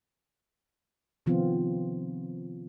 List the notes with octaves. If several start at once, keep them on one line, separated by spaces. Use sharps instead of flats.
C3 D#3 F3 B3 C4 F4